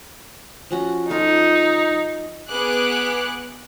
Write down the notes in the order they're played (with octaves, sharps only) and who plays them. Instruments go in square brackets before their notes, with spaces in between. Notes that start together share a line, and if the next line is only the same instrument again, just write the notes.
[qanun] F3 C#4 F#4
[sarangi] D#4 [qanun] F4 A4
[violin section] B3 G#4 D6 F#6